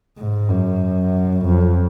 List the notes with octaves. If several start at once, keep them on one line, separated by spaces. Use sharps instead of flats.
G#2
F#2
F2